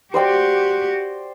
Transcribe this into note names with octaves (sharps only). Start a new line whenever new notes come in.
F#4 G4 C5 D5 G5